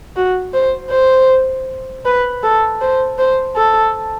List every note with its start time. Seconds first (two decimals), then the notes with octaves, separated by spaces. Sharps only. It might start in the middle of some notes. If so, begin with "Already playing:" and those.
0.16 F#4
0.54 C5
0.91 C5
2.05 B4
2.43 A4
2.81 C5
3.19 C5
3.56 A4